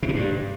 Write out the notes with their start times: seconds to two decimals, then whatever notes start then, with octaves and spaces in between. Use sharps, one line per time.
0.03 B2
0.09 C3
0.15 G2